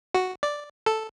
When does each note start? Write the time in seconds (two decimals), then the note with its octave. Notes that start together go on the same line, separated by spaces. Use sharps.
0.14 F#4
0.43 D5
0.86 A4